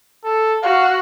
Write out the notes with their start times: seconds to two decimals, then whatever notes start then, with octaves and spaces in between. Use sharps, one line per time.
0.24 A4
0.63 F#4 F5